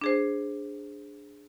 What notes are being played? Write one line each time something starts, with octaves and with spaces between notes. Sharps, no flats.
D4 G#4 C5